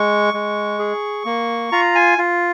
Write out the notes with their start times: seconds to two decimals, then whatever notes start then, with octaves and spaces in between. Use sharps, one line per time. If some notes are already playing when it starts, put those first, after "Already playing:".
Already playing: G#3 C#6
0.34 G#3
0.79 G#4
1.25 A#3
1.72 F4 A#5
1.95 G#5
2.18 F4